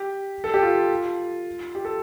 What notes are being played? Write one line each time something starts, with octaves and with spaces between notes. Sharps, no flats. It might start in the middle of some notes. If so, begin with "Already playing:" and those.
Already playing: G4
A4
G4
F4
G4
A4